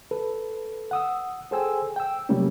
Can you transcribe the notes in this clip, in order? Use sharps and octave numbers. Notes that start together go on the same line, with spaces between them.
A4 B4
F#5 D#6 E6
G#4 A4 C5 G5 G#5 E6
G5 E6
C3 F#3 G3 A3 A#3 C#4